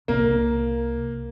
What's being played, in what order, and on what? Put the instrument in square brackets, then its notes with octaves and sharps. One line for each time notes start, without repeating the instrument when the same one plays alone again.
[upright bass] C2 [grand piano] A#3